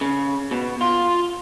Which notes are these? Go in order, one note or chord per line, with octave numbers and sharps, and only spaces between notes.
C#3
B2
F4